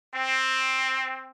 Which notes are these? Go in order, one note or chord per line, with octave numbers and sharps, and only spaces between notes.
C4